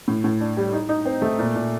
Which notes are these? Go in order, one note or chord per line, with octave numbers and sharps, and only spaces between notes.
A2
A2
D4
G3
D#4
D#4
C4
A3
A#2
A#2